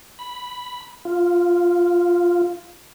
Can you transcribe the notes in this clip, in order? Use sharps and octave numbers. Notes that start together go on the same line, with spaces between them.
B5
F4